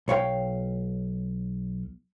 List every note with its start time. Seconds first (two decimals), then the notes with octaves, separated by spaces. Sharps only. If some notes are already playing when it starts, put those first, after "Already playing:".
0.08 B1 C#5 F5 G5